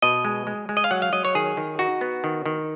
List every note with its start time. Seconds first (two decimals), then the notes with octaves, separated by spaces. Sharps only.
0.02 B2 D#5
0.25 G#3
0.47 G#3
0.69 G#3
0.77 D#5
0.84 F5
0.91 F#3 F#5
1.02 F5
1.13 F#3 D#5
1.25 C#5
1.35 D#3 G#4
1.57 D#3
1.79 D#4 F#4
2.01 B3
2.24 D#3
2.46 D#3